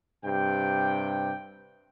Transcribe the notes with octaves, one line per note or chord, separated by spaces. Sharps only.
G2 C3 G4 G5